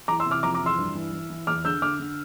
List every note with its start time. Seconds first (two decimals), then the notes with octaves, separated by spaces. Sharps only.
0.08 E3 A#5 D6
0.20 C6 E6
0.25 C3
0.31 D6 F6
0.43 F2 A#5 D6
0.54 A#5 D6
0.60 E3
0.66 C6 E6
0.78 G2
0.95 E3
1.13 E3
1.30 E3
1.47 E2 D6 F6
1.65 D3 E6 G6
1.82 D3 D6 F6
2.00 D3